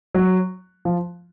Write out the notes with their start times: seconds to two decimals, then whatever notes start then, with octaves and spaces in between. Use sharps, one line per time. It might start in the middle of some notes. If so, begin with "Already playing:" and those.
0.14 F#3
0.85 F3